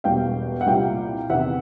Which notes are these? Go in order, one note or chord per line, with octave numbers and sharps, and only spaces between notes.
E1 E2 B2 G3 F5 G5
F#5
C2 A#2 G3 F5 G5
E2 C3 D#3 E5 F#5